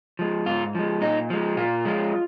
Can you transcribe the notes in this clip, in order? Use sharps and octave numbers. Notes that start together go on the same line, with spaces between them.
F3 G#3
G#2 F4
F3 G#3
A#2 D#4
F3 G#3
A#2 F4
F3 G#3